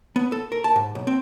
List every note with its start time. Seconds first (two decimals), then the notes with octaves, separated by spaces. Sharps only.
0.16 B3
0.32 A4
0.52 A#4
0.64 A5
0.76 G#2
0.95 B1
1.07 C4